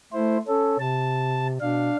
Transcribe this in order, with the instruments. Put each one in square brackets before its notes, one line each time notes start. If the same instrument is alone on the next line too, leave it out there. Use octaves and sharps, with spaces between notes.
[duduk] A3 [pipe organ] E4 C5
[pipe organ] C#4 [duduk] A4
[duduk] C3 [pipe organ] A5
[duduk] B2 [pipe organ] D4 F5